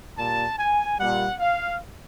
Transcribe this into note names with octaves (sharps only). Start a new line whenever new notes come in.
A#2 G3 A5
G#5
A#2 G3 F#5
F5